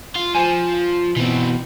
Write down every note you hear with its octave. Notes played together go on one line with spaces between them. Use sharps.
F4
F3 C5 G#5
B2 E3 C4